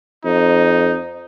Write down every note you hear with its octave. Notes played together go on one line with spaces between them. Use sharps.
F2 D#4